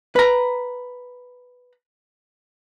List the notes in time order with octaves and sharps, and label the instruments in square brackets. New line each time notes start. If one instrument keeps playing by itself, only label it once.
[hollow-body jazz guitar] B4 A#5